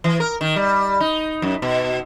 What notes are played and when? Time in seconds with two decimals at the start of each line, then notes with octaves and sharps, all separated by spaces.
0.04 E3
0.20 A#4
0.41 D#3
0.56 G3
1.00 D#4
1.42 F#2
1.62 B2